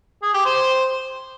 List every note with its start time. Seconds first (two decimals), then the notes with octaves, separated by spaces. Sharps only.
0.22 G#4
0.34 G4
0.45 C5